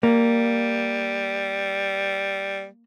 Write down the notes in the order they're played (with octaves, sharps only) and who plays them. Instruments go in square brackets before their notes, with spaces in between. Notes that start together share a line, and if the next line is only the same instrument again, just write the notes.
[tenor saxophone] G3 [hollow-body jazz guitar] A#3